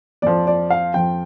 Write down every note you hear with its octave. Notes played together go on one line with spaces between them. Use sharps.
F2 F3 D5
D5
F5
F2 F3 G5